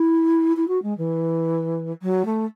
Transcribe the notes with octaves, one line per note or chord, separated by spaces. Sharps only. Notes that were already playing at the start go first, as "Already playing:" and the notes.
Already playing: E4
E4
F#4
G#3
E3
F#3
A3